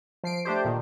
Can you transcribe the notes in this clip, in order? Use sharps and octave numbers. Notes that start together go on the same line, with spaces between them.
F3 C7 D7
A3 D4 G4 C5
A#2 D#3